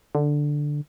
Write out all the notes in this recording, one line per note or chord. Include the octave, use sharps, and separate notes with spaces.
D3